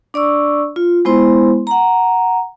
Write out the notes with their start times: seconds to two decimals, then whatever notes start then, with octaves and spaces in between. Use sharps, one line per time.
0.14 D4 D5 C#6 E6
0.76 F4
1.05 G#3 B3 E4 C5 C6
1.67 F#5 A#5